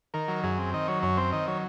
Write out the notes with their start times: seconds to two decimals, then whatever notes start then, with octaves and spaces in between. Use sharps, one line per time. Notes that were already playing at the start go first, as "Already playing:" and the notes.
0.14 D#3 A#4
0.28 F#3
0.44 F#2 G#4
0.58 C4
0.74 D#3 D#5
0.88 F#3 C#5
1.02 F#2 C#5
1.17 C4 C5
1.32 D#3 D#5
1.47 F#3 C#5